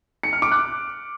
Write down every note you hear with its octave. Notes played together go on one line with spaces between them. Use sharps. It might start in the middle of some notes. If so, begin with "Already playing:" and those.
C#7
F6
D6
F#6